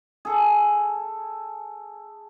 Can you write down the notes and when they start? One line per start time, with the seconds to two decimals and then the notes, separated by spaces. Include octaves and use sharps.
0.25 G#4 A4